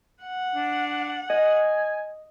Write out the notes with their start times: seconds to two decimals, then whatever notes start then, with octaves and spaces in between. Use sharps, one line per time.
0.23 F#5
0.55 D4
1.30 D#5 G#5